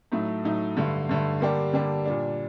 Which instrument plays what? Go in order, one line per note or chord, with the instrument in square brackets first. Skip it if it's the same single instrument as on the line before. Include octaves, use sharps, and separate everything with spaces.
[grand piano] A2 F#3 A3 D#4
A2 F#3 A3 D#4
G2 D3 A3
G2 D3 A3
D3 G3 A#3 D4 G4
D3 G3 A#3 D4 G4
A#2 G3 D4